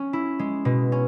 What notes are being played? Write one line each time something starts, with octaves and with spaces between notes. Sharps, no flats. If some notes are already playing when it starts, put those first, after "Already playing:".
Already playing: C#4
E4
G#3
B2
C#4